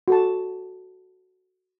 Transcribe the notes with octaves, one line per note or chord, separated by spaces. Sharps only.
F#4 A4 A5